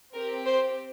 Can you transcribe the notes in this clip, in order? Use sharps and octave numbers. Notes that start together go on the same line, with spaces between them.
C4 G4 A#4
C5